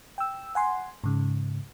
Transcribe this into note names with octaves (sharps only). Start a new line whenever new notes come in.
G5 E6
F#5 G#5 C6
G#2 C#3